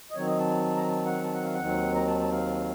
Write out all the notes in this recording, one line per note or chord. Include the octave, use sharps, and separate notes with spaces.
D#5
D#3 F#3 C4 C#5
D#5
A5
A#5
A5
F#5
A5
F#5
F5
F#5
D#2 D#3 F#3 C4
A#5
A5
A5
F5